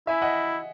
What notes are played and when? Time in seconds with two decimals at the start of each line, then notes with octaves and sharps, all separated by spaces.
0.07 E4 E5 G#5
0.22 D#5 F#5